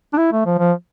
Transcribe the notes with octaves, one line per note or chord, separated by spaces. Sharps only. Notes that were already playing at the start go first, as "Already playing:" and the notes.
D4
E4
A3
F3
F3